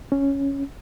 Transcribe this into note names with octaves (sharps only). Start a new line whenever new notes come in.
C#4